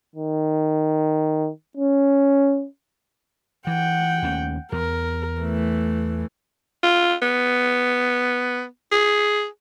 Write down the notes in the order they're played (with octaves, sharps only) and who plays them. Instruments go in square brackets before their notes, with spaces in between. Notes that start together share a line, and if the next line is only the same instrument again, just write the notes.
[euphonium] D#3
C#4
[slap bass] E3 [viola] F#5 G5
[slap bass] D#2 A3 C#4
[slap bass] E2 [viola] A#4
[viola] E3 A3
[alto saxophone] F4
B3
G#4